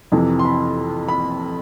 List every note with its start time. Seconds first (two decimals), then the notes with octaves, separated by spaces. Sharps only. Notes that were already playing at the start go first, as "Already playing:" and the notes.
0.12 F2 C3 E3
0.39 C6
0.45 B5
1.09 B5